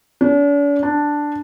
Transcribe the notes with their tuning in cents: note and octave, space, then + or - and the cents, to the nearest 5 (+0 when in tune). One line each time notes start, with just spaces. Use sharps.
D4 -45
D4 +0